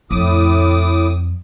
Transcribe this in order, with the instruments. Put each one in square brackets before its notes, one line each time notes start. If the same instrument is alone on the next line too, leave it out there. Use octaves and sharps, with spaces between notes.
[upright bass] F2 [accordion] A2 D6 D#6